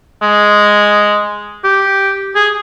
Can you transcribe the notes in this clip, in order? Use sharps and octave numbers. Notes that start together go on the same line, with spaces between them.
G#3
G4
G#4